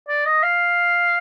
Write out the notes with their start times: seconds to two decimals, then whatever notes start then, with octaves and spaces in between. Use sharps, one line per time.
0.08 D5
0.25 D#5
0.43 F5